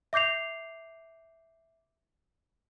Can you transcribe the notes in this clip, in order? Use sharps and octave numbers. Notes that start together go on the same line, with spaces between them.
E5 D6 G6 C7 F7